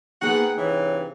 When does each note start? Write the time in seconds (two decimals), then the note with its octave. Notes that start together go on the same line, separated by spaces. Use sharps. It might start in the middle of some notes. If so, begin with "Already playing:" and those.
0.22 G#2 A#3 B3 D#4 G#4 F#5 G5
0.57 G2 C3 E3 C#5